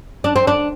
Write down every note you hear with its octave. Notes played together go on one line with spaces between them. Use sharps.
D4
C4
D4